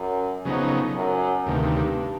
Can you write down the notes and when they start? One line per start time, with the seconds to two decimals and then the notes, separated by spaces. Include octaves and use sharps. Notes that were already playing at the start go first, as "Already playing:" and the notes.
Already playing: F#2
0.45 F2 C#3 F#3 B3 D#4
0.95 F#2
1.46 D2 G2 C3 D#3